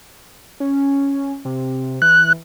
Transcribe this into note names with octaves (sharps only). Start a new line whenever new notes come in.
C#4
C3
E3 F#6